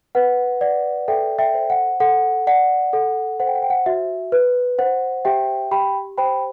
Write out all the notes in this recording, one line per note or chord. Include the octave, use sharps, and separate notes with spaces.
B4 F#5
D5 F#5
A4 E5 G5
E5 G5
C5
F#5
A4 F#5
D5 F#5
A4 F#5
C5 F#5
G5
F#5
G5
F#5
F#4 E5
B4
C5 F#5
G4 E5 G5
G4 G5 B5
C5 G5 B5